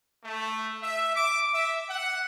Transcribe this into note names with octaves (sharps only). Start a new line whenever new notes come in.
A3
E5
D6
E5
F#5